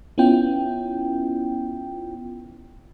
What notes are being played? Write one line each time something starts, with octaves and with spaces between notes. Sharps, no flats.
B3 C#4 E4 F4 G5